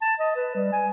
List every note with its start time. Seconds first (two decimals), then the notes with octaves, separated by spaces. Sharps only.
0.02 A5
0.19 D#5
0.36 B4
0.55 G3
0.72 G#5